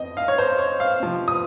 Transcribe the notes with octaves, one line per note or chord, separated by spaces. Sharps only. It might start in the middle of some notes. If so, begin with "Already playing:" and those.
Already playing: F2 C4 D#5
F5
C#5
C5
C#5
F5
C3 F3 C4
D#6